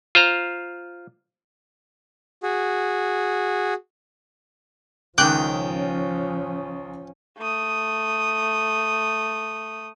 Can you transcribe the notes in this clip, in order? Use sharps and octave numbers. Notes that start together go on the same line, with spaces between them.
F4 C5 A#5
F#4 G#4
C#2 D#3 F3 C#4 G5 D6 F#6 G6
A3 D#6